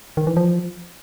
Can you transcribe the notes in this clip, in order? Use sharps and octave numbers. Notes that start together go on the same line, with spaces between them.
D#3
E3
F3